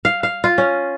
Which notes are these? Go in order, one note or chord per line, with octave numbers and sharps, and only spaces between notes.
F5
F5
F4
C#4